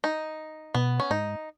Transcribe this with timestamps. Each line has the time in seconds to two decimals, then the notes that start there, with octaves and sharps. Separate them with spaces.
0.04 D#4
0.74 B2 B3
1.00 C#4
1.11 G#2 D#4